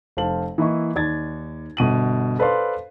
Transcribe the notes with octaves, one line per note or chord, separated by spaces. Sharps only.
F1 C5 F5 A5 F#7
E3 A#3 E4 D#5 C#6
D#2 D5 G#6 A6
G1 B2 D#7 F#7
A4 B4 C5 D5 F5 C6